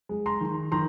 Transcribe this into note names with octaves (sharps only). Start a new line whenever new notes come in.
G#3
A#5 C6
D#3
D#3 A#5 C6